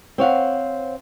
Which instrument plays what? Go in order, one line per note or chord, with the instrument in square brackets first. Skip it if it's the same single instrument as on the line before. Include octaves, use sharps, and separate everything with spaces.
[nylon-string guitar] C4 C#5 F5 F#5